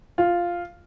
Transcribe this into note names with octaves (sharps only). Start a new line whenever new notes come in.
F4